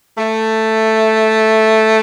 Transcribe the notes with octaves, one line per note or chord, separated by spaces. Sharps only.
A3